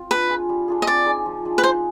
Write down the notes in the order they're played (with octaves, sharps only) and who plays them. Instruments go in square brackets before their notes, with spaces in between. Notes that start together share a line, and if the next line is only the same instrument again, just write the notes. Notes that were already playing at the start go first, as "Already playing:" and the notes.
Already playing: [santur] C4 F4
[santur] D4 [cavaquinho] B4
[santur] F4 G#4
G3
D4 F4 G#4
[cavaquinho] D#5
[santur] C4 [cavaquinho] D5
[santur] D#4 G#4
F3
G#3 D4
[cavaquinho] B4
[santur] D#4 [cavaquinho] C5